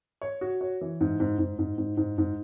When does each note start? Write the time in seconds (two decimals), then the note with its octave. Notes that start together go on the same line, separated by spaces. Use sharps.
0.22 C#5
0.41 F#4
0.61 C#5
0.81 E3
1.01 G#2
1.20 G#2
1.39 G#2
1.59 G#2
1.78 G#2
1.97 G#2
2.18 G#2